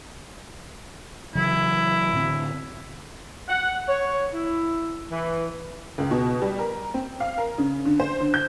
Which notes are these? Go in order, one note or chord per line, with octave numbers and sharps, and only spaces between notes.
C#3 E3 F#3 E4
A2 D3 C4
F#5
C#5
E4
E3
C#2
B2
G3
A#4
C4
F5
A#4
C#3
D3
C5
D3
G6